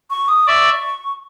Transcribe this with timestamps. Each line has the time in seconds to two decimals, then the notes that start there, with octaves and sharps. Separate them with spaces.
0.10 C#6
0.28 D#6
0.47 D5 E5 C#6